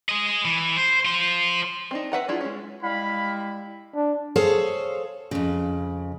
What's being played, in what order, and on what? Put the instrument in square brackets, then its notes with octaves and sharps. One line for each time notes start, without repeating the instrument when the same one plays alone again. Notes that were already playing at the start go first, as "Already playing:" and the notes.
[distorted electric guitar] G#4 D#5
E3
C5
F4 C5
[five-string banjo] C4 D4 D#4
B4 E5 F#5 A#5
D4 E4 F4 G#4
G#3 C#4
[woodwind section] G3 G#3 E4 [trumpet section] F5 B5
[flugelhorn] D4
[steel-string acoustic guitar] G#4 A4 C5 C#5 F5
F2 C#3